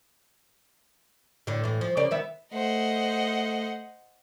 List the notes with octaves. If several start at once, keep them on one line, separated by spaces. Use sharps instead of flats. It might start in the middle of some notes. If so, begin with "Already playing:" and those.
A2 D3
A2 E3
F3
C#3 A#3 D5
D#3 B3 E5
A3 C5 D#5 F#5